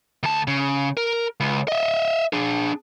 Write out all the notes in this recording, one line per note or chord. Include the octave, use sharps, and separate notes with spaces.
D2 A5
C#3
A#4
C#2
D#5 E5
D4 G#4